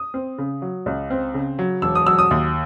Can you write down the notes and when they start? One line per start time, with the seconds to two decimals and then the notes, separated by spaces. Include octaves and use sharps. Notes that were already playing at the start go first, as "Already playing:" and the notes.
Already playing: D#6
0.14 C4
0.38 C#3
0.62 F#3
0.86 C#2
1.10 C4
1.34 C#3
1.59 F#3
1.82 E1 E6
1.95 D#6
2.06 F#3 E6
2.19 D#6
2.31 D#2